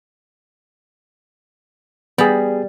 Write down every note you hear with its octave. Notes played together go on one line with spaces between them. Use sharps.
G3 B3 G#4